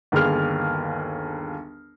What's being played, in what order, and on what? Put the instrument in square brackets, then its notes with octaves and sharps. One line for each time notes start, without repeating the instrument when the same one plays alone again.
[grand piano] G1 D#2 G#4 F6